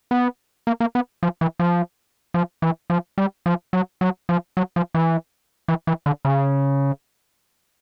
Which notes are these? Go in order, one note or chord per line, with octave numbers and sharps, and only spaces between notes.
B3
A#3
A#3
B3
F3
E3
F3
F3
E3
F3
G3
F3
F#3
F#3
F3
F#3
F3
E3
E3
E3
D3
C#3